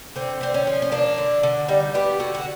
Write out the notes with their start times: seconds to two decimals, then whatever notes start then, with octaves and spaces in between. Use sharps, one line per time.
0.16 D3 C4
0.41 D3 C4
0.54 C#4
0.67 F3
0.82 C#4
0.92 A#3 D4
1.18 D3
1.43 D3
1.68 G3 D#4
1.95 B3 G4
2.19 D3 F#4
2.35 F#4